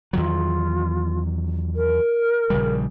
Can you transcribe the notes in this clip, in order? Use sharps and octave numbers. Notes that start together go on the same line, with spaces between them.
E2 D#3 F#3 F4
A#4
A#1 C#3 G3